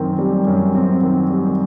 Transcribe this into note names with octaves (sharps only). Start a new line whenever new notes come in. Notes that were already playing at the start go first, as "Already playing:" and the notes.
Already playing: F#2 D#3 C4
G3
F#2
C4
D#3
G3